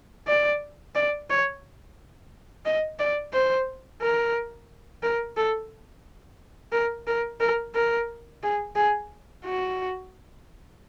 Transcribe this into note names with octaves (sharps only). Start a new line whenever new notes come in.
D5
D5
C#5
D#5
D5
C5
A#4
A#4
A4
A#4
A#4
A#4
A#4
G#4
G#4
F#4